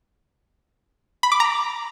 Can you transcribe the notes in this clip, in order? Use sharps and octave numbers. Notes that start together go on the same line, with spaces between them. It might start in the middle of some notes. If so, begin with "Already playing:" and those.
B5
D6
A#5